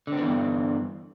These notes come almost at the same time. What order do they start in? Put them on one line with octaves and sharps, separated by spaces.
D3 C4 B3 E3 G2